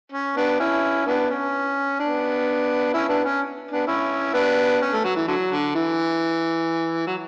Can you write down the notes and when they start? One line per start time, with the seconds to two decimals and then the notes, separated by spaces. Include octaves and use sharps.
0.12 C#4
0.36 B3 D4
0.60 C#4 E4
1.06 B3 D4
1.30 C#4
2.00 B3 D4
2.94 C#4 E4
3.09 B3 D4
3.24 C#4
3.71 B3 D4
3.87 C#4 E4
4.34 B3 D4
4.81 C#4
4.93 A3
5.04 F#3
5.16 E3
5.28 D3 F#3
5.51 D3
5.75 E3
7.07 F#3